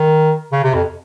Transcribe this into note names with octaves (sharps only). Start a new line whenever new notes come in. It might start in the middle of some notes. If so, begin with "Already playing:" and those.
Already playing: D#3
C#3
C3
F2